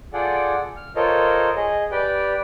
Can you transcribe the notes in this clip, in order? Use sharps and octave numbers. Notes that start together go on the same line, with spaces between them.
F4 G#4 A4 D5 F#5 G5
F6
F4 A4 A#4 C5 C#5 D#5
G#4 D#5
G4 B4 D5 G5